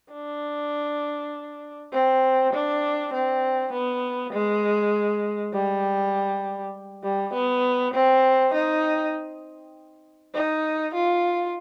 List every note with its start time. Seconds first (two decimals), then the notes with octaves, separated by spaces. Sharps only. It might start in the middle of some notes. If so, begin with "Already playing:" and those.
0.12 D4
1.92 C4
2.53 D4
3.13 C4
3.72 B3
4.33 G#3
5.53 G3
7.03 G3
7.33 B3
7.94 C4
8.54 D#4
10.34 D#4
10.94 F4